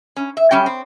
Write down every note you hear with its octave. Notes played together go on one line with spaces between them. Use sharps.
C#4
E5
F#2 G3 C#4 G5
C4